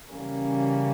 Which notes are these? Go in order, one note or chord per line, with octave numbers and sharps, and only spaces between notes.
C#3 E3 G3 A#3 C#4